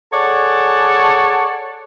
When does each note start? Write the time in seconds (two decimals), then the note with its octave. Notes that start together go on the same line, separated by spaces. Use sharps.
0.13 G#4 A4 C#5 D5 F#5 A5